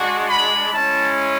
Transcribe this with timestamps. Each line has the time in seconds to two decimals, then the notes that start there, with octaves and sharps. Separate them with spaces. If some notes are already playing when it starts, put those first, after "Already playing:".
Already playing: G#3 D4 F#4
0.30 B5
0.72 G#3 C#4 E4 A5